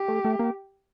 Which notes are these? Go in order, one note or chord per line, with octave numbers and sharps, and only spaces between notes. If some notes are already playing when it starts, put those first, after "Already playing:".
Already playing: G4
A3
A3
A#3